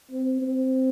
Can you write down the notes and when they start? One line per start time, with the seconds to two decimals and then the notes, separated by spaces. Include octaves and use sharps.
0.11 C4
0.42 C4